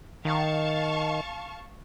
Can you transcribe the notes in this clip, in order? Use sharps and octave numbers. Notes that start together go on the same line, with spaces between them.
D#3 F5 A5 C#6